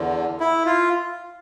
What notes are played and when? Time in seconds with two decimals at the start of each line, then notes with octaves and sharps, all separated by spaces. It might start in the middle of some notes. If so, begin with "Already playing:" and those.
Already playing: E2 D3
0.40 E4
0.66 F4